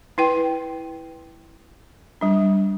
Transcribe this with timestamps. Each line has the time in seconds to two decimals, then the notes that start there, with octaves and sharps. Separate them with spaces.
0.18 E4 B4 G5
2.21 G3 D4